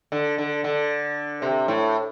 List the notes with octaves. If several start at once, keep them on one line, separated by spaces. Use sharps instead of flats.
D3
D3
D3
C3
A2